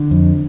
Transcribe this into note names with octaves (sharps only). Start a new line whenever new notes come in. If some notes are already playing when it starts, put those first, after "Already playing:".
Already playing: D3
F2